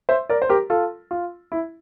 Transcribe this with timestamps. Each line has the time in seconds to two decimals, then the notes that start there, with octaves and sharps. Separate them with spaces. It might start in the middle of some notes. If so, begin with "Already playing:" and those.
0.09 C5 E5
0.30 A#4 D5
0.42 C5
0.49 G4 A#4
0.70 F4 A4
1.11 F4
1.52 E4